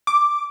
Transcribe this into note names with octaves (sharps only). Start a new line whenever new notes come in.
D6